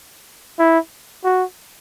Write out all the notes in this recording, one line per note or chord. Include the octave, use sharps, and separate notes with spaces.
E4
F#4